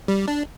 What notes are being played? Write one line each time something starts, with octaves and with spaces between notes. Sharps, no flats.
G3
D4